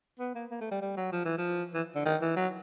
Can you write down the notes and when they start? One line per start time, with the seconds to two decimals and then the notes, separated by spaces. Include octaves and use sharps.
0.19 B3
0.35 A#3
0.51 A#3
0.61 A3
0.71 G3
0.81 G3
0.97 F#3
1.12 F3
1.25 E3
1.38 F3
1.74 E3
1.95 D3
2.05 D#3
2.21 E3
2.36 F#3